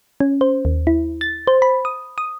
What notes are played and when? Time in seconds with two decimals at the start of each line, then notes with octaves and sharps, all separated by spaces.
0.20 C#4
0.41 C5
0.65 D#2
0.87 E4
1.21 A6
1.47 C5
1.62 B5
1.85 D#6
2.18 D#6